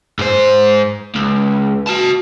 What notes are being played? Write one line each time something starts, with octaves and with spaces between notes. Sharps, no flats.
G#2 C5
C#2
F#4 A5